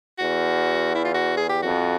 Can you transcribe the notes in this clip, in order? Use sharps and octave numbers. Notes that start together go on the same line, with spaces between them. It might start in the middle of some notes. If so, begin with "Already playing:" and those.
E2 F#4
E4
F4
F#4
G#4
G4
F2 F#4